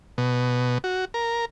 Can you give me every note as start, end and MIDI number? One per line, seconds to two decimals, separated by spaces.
0.18 0.78 47
0.84 1.05 66
1.14 1.45 70